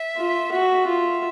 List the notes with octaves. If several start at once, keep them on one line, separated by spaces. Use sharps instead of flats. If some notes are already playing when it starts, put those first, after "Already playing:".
Already playing: E5
F4
F#4 E5
F4